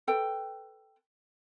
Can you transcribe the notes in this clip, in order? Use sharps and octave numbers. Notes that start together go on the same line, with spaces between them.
A4 B4 G5